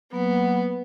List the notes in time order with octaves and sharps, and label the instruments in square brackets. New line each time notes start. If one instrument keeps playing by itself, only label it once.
[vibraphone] F#3 A#3 F#5 [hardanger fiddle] B3